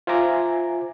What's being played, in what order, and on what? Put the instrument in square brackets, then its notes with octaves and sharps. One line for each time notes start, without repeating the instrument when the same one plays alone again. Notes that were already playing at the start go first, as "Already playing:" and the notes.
[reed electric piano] F4 C5 E5 G#5 A#5 D6